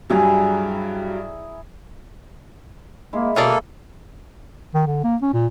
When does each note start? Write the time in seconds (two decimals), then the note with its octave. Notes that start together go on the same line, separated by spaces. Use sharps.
0.10 G2 F#3 G3 E4 G#4 A#5
3.13 G#3 A#3 E4
3.36 B2 A#3 C#4 G#4 A4 D5
4.74 D#3
4.87 D3
5.04 A#3
5.22 C#4
5.34 A#2